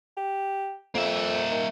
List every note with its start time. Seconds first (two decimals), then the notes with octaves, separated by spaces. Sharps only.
0.17 G4
0.95 F2 A#3 E5
1.51 D#3